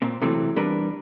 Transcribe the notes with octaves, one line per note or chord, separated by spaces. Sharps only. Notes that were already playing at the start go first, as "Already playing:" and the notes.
A#2 C4
C3 E3 F#3 A3 C4
E2 G3 D4 A#4 B4